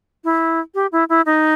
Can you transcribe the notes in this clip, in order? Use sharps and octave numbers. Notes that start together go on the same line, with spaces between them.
E4
G4
E4
E4
D#4